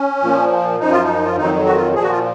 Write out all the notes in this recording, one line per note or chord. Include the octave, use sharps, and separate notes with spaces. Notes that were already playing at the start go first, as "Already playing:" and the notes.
Already playing: C#4
A#2 F3
F#2 F3 D#4
F4
D#4
F4
F2 D#3 F#3 D#4
F#4
F4
A#2 F3 G#4
F#4
F4